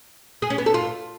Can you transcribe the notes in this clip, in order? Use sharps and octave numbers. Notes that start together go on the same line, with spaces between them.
G#4
C#4
B3
A4
F4